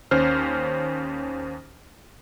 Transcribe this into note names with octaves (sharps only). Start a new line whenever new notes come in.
D#2 C#4 C5 F6